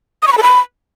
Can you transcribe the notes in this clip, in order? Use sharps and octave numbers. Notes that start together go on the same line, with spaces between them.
D#6
C#6
B5
A4
B5